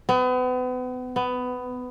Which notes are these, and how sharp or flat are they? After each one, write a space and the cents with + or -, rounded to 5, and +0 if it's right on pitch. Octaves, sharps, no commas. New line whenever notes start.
B3 +35
B3 +15